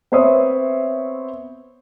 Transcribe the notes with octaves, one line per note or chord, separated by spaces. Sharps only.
B3 C4 C5 C#5 E5 D#6